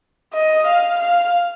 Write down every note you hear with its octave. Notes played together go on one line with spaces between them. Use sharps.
D#5
F5
F5